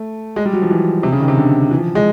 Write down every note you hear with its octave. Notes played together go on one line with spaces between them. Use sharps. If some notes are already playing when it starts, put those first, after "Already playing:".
Already playing: A3
G#3
G3
F#3
F3
E3
C3
C#3
D#3
C3
D3
E3
F3
G#3